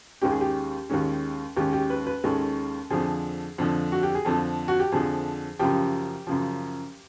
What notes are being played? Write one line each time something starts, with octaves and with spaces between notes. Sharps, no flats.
D#2 D#3 G#3 C#4 G4
G#4
G4
D#2 D#3 G#3 C#4
D#2 D#3 G#3 C#4 G4
G4
B4
B4
D#2 D#3 G#3 C#4 A4
F2 D3 F3 G#4
F2 D3 F3
F#4
G4
G#4
F2 D3 F3 A4
F#4
G4
F2 D3 F3 G#4
F#2 C#3 F3 G4
F#2 C#3 F3